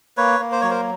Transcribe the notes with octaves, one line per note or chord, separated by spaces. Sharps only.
A#3 B4 C#5
A#3
C5
F#3 C#5
A#4 C5